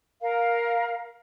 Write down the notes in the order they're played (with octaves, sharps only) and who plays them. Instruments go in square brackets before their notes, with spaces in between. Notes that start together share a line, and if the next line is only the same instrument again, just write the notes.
[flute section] A#4 F5